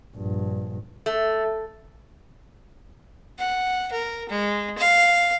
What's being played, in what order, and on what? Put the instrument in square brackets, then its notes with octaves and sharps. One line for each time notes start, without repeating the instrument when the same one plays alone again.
[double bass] A#1 G2
[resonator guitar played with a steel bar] A3
[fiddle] F#5
A#4
G#3
F5